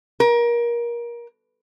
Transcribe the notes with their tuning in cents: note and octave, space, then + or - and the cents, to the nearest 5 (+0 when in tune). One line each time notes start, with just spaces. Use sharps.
A#4 +25